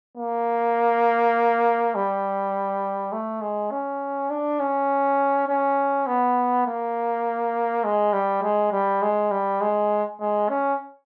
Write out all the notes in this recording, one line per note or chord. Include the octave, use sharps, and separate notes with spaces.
A#3
G3
A3
G#3
C#4
D4
C#4
C#4
B3
A#3
G#3
G3
G#3
G3
G#3
G3
G#3
G#3
C#4